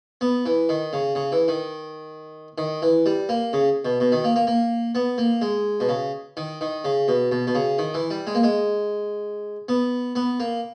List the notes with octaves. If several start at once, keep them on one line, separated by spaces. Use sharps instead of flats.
B3
E3
D#3
C#3
C#3
E3
D#3
D#3
E3
G3
A#3
C#3
B2
B2
D#3
A#3
A#3
A#3
B3
A#3
G#3
B2
C#3
D#3
D#3
C#3
B2
B2
B2
C#3
D#3
E3
G3
G#3
A#3
G#3
B3
B3
A#3